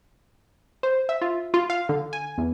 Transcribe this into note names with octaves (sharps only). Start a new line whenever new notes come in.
C5
E5
F4
F4
F5
D3
G#5
E2